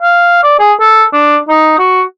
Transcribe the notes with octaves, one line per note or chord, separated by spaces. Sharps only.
F5
D5
G#4
A4
D4
D#4
F#4